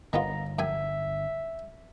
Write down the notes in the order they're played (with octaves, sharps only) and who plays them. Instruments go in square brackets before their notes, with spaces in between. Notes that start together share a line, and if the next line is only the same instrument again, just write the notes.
[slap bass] G1 [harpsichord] D#3 B3 F4 [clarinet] A#5
[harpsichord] F#2 G5 G#5 [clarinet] E5